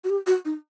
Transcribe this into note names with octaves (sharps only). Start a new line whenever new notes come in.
F#4
G4
F#4
D#4